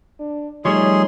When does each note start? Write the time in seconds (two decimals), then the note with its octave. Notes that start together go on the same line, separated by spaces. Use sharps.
0.19 D4
0.65 F3 G3 A3 D#4 G#4 C#5 C6